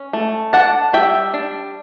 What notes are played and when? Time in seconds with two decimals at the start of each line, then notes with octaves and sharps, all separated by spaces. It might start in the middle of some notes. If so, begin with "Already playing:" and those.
Already playing: C#4
0.13 A3
0.53 D4 F#5 A5
0.93 G3 E5 G5
1.34 D4